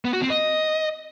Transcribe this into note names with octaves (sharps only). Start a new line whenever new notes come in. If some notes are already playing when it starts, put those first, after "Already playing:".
B3
F#4
C4
D#5